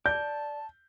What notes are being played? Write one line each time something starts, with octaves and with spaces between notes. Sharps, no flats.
D5 A5 G6